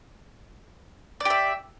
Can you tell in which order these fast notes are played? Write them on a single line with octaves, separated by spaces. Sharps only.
D5 G4 E5